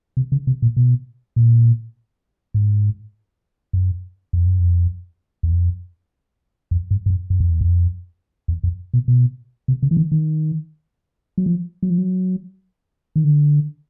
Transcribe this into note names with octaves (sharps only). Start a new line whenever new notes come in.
C3
C#3
C3
A#2
B2
A#2
G#2
F#2
F2
F#2
F2
E2
F2
F2
G2
G2
F#2
F#2
F2
E2
F2
E2
F2
B2
B2
C3
C#3
E3
D#3
D#3
F#3
F3
F#3
F3
F#3
D#3
D3